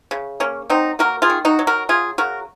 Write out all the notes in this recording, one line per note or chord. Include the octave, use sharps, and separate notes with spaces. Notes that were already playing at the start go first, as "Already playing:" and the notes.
C#3
A#3 C#4
F#3 C4 D#4
A#3 F#4 A#4
F4 G#4
D#3
D#4 F#4
F#3
F#4 A#4
C#3 F4 G#4
C#3 F#4 A#4